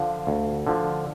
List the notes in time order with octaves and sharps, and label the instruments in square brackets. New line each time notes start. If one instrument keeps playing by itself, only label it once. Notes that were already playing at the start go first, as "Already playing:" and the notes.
Already playing: [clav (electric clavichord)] D3 F3 [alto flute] F5
[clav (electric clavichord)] D2
D3 F3